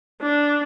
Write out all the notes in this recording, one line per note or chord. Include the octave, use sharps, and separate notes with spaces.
D4